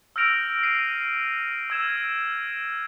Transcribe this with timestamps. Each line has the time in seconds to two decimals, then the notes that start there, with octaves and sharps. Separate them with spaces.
0.16 E6 F6 G6 A#6 D7 F7
0.63 C7 D#7
1.70 E6 G#6 E7